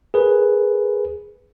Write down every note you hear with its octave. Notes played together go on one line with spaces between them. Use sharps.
G#4 A#4 B4